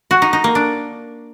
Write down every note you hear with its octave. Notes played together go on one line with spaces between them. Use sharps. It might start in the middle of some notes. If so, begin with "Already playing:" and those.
F#4
D#4
D#4
A#3
D4